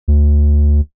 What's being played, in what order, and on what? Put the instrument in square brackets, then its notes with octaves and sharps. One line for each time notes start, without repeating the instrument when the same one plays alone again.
[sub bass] D2